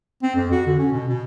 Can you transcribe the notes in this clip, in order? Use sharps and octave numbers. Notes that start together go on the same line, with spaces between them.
C4
F2
F#4
D3
C#4
B2
B2